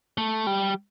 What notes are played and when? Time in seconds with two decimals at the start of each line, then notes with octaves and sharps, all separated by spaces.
0.18 A3
0.47 G3